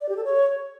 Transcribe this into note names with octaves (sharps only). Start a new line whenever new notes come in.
D5
G4
A4
C#5